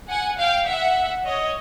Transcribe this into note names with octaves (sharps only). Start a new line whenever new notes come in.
F#5 G#5
F5 G5
E5 F#5
C#5 D#5